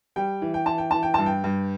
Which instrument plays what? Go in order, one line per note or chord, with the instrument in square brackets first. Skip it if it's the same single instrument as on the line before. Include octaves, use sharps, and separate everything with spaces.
[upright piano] G3 G5
E3
G5
E3 A5
G5
E3 A5
G5
G2 A5
G5
G2